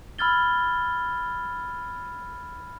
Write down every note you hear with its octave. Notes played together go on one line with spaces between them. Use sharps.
B5 E6 F6 G#6 A6 G7